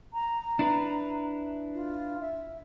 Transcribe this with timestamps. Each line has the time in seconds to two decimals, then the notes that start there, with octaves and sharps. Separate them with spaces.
0.13 A#5
0.59 D4 E4 B4
1.74 F4
2.20 E5